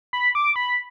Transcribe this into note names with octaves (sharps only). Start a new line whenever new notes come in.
B5
D6
B5